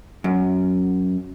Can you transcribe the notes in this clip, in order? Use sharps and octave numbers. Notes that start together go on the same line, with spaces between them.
F#2